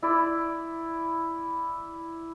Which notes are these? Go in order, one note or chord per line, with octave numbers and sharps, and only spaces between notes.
E4 D5